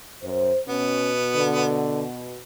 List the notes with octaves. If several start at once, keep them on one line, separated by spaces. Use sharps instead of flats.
F#2 C5
B2 B3 C#4
D3